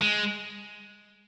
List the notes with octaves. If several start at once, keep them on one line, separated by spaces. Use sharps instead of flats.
G#3